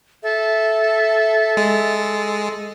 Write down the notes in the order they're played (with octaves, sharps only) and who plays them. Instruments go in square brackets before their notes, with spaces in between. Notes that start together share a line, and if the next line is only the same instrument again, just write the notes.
[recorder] A4 [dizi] E5
[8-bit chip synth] G#3